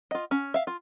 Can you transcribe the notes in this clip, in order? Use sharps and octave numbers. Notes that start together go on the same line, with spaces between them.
F4 D#5
C#4
E5 F5
F4